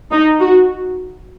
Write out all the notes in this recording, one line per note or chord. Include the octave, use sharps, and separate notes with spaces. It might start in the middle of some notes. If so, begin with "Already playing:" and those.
D#4
F#4